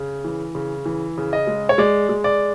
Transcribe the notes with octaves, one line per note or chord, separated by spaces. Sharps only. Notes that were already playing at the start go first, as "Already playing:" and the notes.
Already playing: C#3
E3
C#3
E3
C#3
D#5
G#3
C#5
G#3 D5
G#3
D5